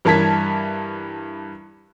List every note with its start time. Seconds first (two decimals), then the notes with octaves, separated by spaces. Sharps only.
0.05 G2 E3 A#4 A5 G#6 B6